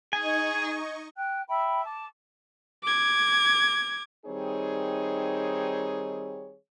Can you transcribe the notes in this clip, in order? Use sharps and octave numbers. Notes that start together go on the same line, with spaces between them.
D#4 G#4 D#5 G#5 C#6
G5 F#6
E5 G5 B5
A5 D6
D6 G#6
D#3 G3 C4 D#4 G#4 C#5